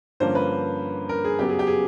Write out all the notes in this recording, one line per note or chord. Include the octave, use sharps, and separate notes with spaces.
G2 D3 F3 A#3 C#4 C5
B4
A#4
G#4
F#2 C#3 F#3 B3 G4
G#4
G4
G#4